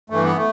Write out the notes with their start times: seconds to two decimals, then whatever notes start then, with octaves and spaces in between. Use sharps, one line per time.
0.10 G2 E3 A3
0.24 B3
0.37 A3